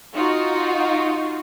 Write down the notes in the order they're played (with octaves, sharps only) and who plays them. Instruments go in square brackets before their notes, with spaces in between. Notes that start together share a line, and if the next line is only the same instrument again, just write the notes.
[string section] D#4 F4 F#4